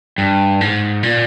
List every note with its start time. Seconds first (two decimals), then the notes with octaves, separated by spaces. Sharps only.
0.18 G2
0.61 G#2
1.03 A#2